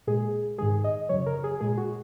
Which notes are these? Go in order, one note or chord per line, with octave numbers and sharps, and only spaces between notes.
A#2 G#3 G#4
G#2 D#3 G#3 G#4
D#5
F#2 C#3 F#3 C#5
A#4
G#4
A#2 G#3 G#4
F#4